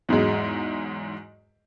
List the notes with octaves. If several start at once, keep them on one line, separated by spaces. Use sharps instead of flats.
E2 G#2 F#3 G#3